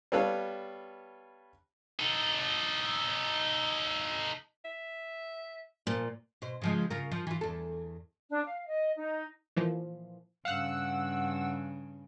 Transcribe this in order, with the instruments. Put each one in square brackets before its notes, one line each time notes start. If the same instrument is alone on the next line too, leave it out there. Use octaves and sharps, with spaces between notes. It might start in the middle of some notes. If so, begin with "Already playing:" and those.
[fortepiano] G3 B3 A4 B4 C#5 F5
[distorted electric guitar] D#4 A4
[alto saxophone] E5
[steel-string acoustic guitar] A#2 [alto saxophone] F3
[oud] B2 C5
C#3 F3 G#3
C#3 F4 A#4
F3
E3 F4
E2 A4
[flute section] D4
F5
D#5
D#4
[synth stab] A#2 E3 F3
[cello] G2 C#3 [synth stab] F5 F#6 [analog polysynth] F#5 E6